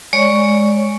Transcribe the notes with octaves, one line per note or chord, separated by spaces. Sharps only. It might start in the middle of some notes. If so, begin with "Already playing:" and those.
G#3 C#5 D5 C#6